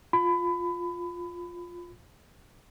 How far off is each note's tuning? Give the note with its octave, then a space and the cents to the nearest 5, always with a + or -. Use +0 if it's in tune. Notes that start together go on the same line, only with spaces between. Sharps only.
F4 +10 B5 +25